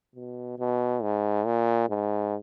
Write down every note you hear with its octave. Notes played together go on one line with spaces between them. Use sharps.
B2
B2
G#2
A#2
G#2